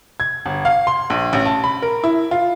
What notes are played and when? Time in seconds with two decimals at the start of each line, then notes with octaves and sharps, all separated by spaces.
0.20 G#6
0.46 G1
0.65 F5
0.87 C6
1.10 A#1
1.33 A1
1.46 A5
1.64 B5
1.82 A#4
2.04 E4
2.31 F4